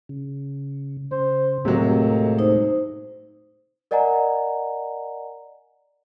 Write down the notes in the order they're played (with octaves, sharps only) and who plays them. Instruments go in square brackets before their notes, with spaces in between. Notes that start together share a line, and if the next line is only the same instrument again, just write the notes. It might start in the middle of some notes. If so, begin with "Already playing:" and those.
[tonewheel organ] C#3
[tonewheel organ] C#3 [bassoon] C5
[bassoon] D#2 [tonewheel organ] A2 G#3 A3 [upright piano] C3 F#3
[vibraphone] D#4 C5
[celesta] A#4 D5 D#5 F#5 G#5 A#5